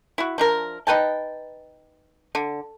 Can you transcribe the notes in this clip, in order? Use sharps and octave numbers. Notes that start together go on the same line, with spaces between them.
E4 F#4
F3 D4 A#4
D#4 B4 G5 A5
D3